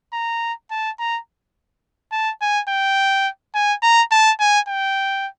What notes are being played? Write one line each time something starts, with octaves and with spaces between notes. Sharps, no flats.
A#5
A5
A#5
A5
G#5
G5
G#5
A#5
A5
G#5
G5